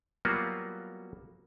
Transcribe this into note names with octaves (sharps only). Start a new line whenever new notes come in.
F#3 G3 A#3 B3 F4 F#4